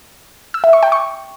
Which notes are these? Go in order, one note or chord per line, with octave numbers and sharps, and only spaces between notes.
E6
E5
C#6
G5
C#6